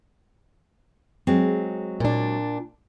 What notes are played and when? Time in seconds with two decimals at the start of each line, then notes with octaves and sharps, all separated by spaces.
1.27 F#3 G#3 C4
2.00 A#2 D4